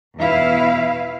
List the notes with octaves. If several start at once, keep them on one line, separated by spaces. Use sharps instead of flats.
E2 B2 E4 B4 F5